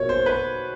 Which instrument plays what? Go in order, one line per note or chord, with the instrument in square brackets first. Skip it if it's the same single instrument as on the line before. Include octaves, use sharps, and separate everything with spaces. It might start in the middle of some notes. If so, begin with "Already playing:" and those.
Already playing: [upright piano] B2 F#3 A#3 [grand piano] C#5
[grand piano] C5
B4